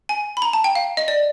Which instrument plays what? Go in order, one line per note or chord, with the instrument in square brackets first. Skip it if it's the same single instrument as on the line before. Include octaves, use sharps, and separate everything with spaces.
[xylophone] G#5
B5
A#5
A5
G5
F5
D#5
D5